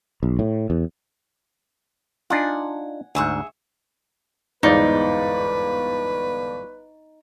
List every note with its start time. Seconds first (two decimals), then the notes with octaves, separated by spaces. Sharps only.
0.23 B1
0.39 A2
0.70 E2
2.30 D4 D#4 F4 F#5 G#5
3.15 D2 G#2 G#4 E5 C#6
4.63 G1 E2 G#2 D#4 B4 D5